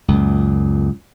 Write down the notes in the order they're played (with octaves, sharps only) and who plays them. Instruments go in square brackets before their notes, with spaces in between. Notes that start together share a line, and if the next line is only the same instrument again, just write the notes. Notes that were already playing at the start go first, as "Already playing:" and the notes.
[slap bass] C#2 F#2 A#2